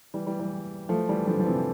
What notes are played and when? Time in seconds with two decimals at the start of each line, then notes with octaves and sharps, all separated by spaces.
0.14 E3 G3
0.26 E3 G3
0.39 E3 G3
0.89 F3 A3
1.09 E3 G3
1.27 D3 F3
1.39 F3
1.46 C3 E3